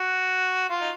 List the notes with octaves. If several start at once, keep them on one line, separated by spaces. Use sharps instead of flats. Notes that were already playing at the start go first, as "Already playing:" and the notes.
Already playing: F#4
F4
D#4